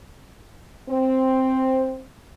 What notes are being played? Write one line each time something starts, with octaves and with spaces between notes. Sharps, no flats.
C4